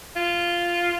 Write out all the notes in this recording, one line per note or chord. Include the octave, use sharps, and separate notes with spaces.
F4